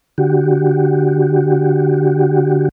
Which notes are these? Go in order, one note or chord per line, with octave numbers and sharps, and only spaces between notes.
D3 F#4 G4